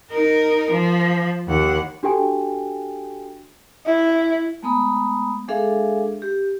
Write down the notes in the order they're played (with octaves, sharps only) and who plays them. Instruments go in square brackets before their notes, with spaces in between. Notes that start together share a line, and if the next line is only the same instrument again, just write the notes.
[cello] D#4 A#4
F3
D#2 F#5
[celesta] D4 F#4 G4 A4 G5 G#5
[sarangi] E4
[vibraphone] G#3 A3 B3 A#5 B5 D#6
G#3 D4 G#4 A4 E5 F5
G4